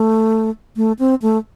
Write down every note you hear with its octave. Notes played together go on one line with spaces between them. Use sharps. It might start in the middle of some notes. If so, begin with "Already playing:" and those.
Already playing: A3
A3
C4
A3